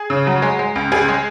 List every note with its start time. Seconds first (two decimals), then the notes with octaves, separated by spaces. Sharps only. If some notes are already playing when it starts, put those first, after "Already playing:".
Already playing: G#4
0.10 C#3
0.27 F#3
0.42 G#3
0.59 G#3
0.76 C#2
0.92 C#2 G#4
1.08 G#3